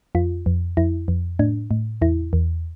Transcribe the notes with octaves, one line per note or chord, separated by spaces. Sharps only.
F2 F4
F2
F2 E4
F2
A2 D4
A2
E2 E4
E2